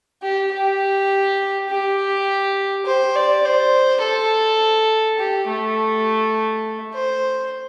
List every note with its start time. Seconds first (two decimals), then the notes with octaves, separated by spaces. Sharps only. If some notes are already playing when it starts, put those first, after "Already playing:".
0.23 G4
0.53 G4
1.69 G4
2.86 C5
3.15 D5
3.45 C5
4.02 A4
5.19 G4
5.48 A3
6.94 C5